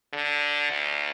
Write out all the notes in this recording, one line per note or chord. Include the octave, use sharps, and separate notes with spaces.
D3
D2